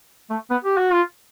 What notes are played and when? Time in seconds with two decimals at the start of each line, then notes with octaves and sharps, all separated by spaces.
0.30 A3
0.50 B3
0.64 G4
0.77 F#4
0.92 F4